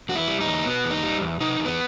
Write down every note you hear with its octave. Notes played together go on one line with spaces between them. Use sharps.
E2 F#4
E4
G3
D#4
E2
B2 B3
E2
D#4
G3
E2
C3 D#4
E2
B3